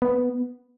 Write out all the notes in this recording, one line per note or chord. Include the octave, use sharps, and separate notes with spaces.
B3